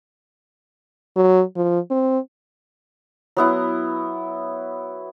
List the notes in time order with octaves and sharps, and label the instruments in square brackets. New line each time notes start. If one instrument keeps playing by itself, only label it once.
[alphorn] F#3
F3
C4
[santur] F#3 B3 E4